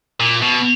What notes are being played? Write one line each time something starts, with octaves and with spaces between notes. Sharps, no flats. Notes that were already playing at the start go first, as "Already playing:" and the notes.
A#2
B2